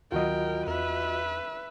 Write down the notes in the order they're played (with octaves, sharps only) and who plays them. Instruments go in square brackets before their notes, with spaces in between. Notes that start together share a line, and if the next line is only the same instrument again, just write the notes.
[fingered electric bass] D2 D#3 F#3 [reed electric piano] F4 F#4 D#5 [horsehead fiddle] A#4 G5
[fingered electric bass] E2 [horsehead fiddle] B4 E5